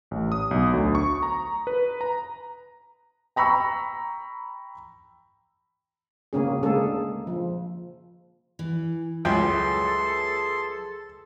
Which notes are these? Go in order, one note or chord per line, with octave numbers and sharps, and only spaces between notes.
A1
D#6
B1
D2
C#6
A#5
B4
A#5
G5 A#5 B5 C#6 E6
C#3 A#3 C#4 G#4
D3 G#3 A#3 G#4 A4
F3
E3
C#2 F#3 G#4 A4 B4 E5 G5 C6